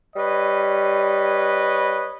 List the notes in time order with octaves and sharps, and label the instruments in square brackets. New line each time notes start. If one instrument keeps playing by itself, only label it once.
[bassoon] G3 [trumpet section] B4 C#5 D#5